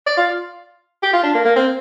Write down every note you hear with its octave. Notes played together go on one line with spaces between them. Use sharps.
D5
F4
G4
F4
D4
A#3
A#3
C4